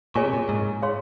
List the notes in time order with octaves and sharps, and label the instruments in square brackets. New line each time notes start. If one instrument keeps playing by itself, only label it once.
[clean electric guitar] A#2 [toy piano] G#4 C#5 G#5 C#6
[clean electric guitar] C3
A#2
G#2
[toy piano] G#4 C#5 F5 C6